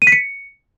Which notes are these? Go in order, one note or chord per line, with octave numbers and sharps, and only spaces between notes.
D#7
B6
C#7